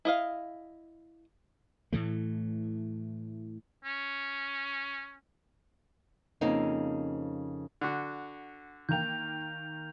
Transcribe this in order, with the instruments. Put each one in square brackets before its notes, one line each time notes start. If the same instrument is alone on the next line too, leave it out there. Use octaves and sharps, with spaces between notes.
[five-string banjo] E4 D#5 F5
[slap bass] A2 E3 A3
[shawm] C#4
[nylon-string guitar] F2 C#3 A#3 C4 D#4
[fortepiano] D3 F#4
[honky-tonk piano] D#3 A#3 G5 [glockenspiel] G6 F7